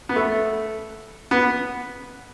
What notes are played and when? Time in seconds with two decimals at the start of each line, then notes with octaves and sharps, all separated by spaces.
0.09 B3
0.16 A3
1.31 B3